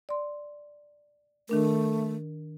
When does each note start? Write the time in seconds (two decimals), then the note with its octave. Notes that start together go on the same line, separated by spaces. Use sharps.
0.09 D5 C6
1.49 D#3 A3 D4 A#4